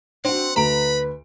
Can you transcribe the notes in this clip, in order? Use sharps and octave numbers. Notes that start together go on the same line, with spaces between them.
C4 D4 F#4 F#5
D2 B4 A#5 B5 D7